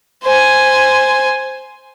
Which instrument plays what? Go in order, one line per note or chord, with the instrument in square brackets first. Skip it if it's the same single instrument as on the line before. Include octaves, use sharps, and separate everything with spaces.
[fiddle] C5 G#5